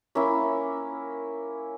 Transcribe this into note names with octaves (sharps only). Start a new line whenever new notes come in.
A#3 C#4 E4